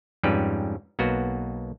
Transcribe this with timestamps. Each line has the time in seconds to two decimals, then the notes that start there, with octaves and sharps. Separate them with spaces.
0.23 F2 G#2 G3 C#4 B4
0.99 B1 A#3 B3 F#4